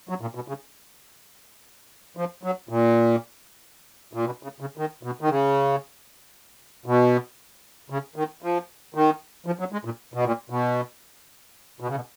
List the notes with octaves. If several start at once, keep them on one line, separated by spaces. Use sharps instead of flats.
F#3
A#2
B2
C#3
F3
F#3
A#2
A#2
B2
C#3
C#3
D#3
B2
D#3
C#3
B2
C#3
D#3
F3
D#3
F3
F#3
G#3
A#2
B2
A#2
B2
B2
C#3
B2